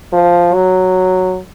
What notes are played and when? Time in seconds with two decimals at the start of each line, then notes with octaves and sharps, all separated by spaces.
0.13 F3
0.54 F#3